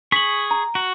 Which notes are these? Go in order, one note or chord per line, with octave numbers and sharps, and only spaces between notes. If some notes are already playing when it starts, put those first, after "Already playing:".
G#4 C#6 B6 F#7
A#5
F#4